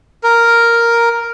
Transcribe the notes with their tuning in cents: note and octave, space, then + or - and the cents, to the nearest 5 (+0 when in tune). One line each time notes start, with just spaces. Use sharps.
A#4 +0